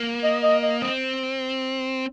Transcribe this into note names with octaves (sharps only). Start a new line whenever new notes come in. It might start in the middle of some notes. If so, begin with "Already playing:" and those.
Already playing: A#3
D#5
D#5
D#5
C4 D#5